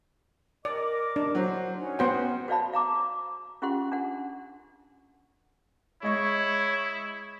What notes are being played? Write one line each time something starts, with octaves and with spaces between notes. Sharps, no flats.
A#4 D5 D#5 D6
D4
F#3 C5
C#4 D#4 F#5
B3 F#4 C5 G5
F#4 C5 D5 F5 A5 B5
F5 A#5 D6
C#4 F4 G4 F#5 C6
D4 F#5
G#3 E4 C#5 D#5 C#6